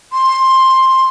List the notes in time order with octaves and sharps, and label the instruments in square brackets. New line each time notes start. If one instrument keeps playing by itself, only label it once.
[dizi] C6